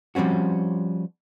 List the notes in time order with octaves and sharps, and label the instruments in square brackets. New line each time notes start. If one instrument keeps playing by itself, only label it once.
[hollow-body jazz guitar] F3 G3 C4 C#4 F#4